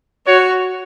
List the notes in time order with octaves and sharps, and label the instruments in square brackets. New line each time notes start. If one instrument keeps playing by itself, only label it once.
[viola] F#4 [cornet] C#5